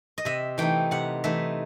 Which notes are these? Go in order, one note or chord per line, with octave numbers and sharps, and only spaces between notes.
D#5
C3 E5
E3 A3 D#4 G5
C3 F#5
E3 A3 D#4 E5